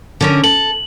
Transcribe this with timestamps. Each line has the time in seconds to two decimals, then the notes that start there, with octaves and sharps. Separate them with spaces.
0.21 D3 C#4 A#4
0.44 A4 F#7